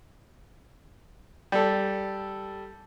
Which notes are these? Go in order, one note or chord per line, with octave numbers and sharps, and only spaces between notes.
G3 A4